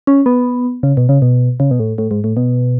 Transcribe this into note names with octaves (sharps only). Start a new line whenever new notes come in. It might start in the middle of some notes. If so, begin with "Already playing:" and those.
C#4
B3
C#3
B2
C#3
B2
C#3
B2
A2
A2
G#2
A2
B2